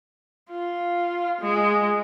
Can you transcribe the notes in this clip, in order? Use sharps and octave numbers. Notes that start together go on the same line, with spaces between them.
F4
G#3